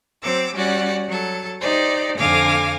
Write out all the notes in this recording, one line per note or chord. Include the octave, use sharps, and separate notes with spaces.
F#3 C4 D6 E6
G3 C#4 F#4 D5 F#5
F#3 A4
D#4 G4 C5 D5
F2 D3 F5 G#5 D6 A#6